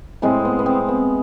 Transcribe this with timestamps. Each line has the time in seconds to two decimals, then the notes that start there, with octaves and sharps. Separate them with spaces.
0.22 A2 G#3 C4
0.45 B3
0.59 B3
0.66 C4
0.88 B3